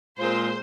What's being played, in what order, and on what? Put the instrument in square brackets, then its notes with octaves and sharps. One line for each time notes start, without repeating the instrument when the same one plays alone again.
[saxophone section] A#2 G#3 C4 F4 A#4 [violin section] C5